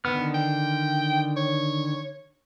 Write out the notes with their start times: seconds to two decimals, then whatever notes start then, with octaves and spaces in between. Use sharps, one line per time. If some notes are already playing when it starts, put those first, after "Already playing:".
0.05 D3 D#3 B3 F6
0.34 G5
1.36 C#5